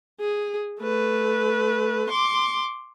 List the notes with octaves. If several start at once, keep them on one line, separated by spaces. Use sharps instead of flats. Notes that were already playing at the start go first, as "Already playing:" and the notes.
G#4
A3 B4
C6 D6